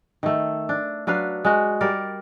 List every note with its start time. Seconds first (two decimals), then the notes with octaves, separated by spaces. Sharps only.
0.23 D#3 A3
0.69 D4
1.07 F#3 D4 B4 F5
1.45 G#3 F#4
1.81 G3 A#4 D5